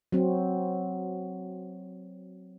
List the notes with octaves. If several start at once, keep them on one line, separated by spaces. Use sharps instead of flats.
F#3 C4